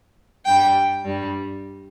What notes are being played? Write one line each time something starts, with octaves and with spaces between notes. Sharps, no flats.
G2 G3 G5
G2 G3